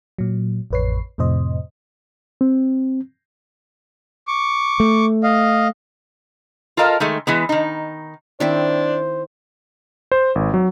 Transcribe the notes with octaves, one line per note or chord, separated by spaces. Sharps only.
A#2 F#3
A1 F2 B4 C#5 C7
F2 A2 C3 C5 D#5
C4
C#6 D6
A3
D#5 F5
F4 A4 A#4 D#5 F5
D#3 G#3 A3
E3 G#3 B3
D#3 D#4
D#3 C4 D4 E4 C5
C5
G#1
F#3